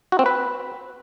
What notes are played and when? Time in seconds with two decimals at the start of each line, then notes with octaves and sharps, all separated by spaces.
0.12 F#4
0.19 C4
0.26 B4